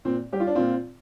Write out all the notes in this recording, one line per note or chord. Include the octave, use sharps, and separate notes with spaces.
A#2 C4
G3 G4
F4
D4
A#2 C4 F4